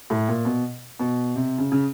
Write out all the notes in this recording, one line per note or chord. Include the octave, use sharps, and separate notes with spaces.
A2
A#2
B2
B2
C3
C#3
C#3